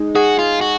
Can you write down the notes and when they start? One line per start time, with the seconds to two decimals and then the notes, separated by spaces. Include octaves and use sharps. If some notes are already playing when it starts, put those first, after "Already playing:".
Already playing: G#3 D#4
0.15 F#4 G#4
0.39 F4
0.61 F#4